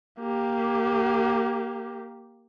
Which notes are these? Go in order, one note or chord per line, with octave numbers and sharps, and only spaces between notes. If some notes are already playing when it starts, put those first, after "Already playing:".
A#3 G4